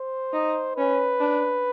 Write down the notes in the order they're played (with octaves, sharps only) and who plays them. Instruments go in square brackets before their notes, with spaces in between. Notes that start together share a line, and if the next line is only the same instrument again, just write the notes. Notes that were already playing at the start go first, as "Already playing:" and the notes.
Already playing: [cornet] C5
[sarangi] D#4
[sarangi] C#4 [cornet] B4
[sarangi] D4